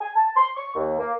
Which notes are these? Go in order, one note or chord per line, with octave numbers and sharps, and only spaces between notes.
G#5
A5
C6
C#6
D#2
A#3